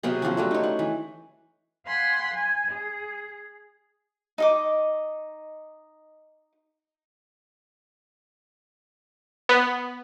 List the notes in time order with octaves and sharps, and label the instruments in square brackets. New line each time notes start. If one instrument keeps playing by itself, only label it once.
[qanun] C3 F#3 B3 G#4
F3 F#3 C4 C#4
F#3 G3 A3
D#4 C#5
F#5
E3
[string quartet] F5 F#5 G#5 B5 C6
G#5
G#4
[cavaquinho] D#4 D#5 D6
[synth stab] B3